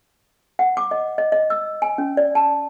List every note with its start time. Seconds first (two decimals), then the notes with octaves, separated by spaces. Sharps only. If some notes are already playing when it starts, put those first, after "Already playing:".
0.59 F#5
0.77 D6
0.91 D#5
1.18 D#5
1.32 D#5
1.50 E6
1.82 G#5
1.98 C#4
2.17 D5
2.35 A5